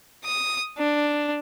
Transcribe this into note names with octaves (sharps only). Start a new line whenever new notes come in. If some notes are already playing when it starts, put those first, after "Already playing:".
D#6
D4